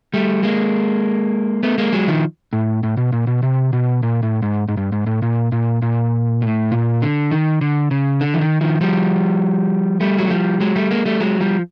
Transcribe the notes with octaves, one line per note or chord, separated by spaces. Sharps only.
G3 A3
G#3 A#3
A3 B3
G#3 A#3
F#3 G#3
D#3 F3
A2
A2
B2
A#2
B2
C3
B2
A#2
A2
G#2
G#2
G2
G#2
A2
A#2
A#2
A#2
A2
A#2
D3
D#3
D3
C#3
D3
E3
D#3
D#3 F3
F3 G3
G3 A3
F#3
F3 G3
F#3 G#3
G3 A3
G#3 A#3
G3 A3
F#3 G#3
F3 G3